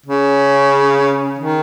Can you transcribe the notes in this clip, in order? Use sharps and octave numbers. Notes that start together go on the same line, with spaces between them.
C#3
D#3